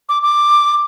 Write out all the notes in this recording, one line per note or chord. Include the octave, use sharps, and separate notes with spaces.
D6
D6